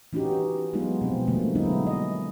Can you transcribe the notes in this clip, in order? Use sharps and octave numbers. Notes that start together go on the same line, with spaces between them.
E3 C#4 D#4 F#4 G4
F#3 G#3 B3 D#4 F4
B2 F3 C4
B2 D3 F3 G3 A3 A#3
F#3 G#3 B3 D#4 E4
D#5